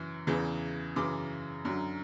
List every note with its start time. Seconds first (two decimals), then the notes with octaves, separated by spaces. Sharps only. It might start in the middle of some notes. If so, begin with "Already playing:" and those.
Already playing: F#2 E3
0.27 E2 C#3 E3
0.96 F#2 C#3 E3 D6
1.65 F#2 D3 F#3